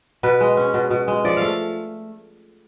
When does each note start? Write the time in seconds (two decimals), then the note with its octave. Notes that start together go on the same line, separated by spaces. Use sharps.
0.23 B2 B4
0.40 G#3
0.57 C#4
0.74 B2
0.91 B2
1.08 G#3
1.24 F3 D5
1.37 A3 F5